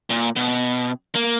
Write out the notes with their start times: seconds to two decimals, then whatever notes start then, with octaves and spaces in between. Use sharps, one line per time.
0.10 A#2
0.36 B2
1.15 A#3